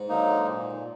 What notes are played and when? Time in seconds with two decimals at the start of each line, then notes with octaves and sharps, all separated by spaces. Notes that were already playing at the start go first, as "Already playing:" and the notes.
Already playing: G#2
0.09 D3 F#3 A#3 D#4
0.46 A#2